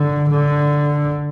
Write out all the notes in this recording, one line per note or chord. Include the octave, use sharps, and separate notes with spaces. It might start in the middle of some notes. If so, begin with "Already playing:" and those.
Already playing: D3
D3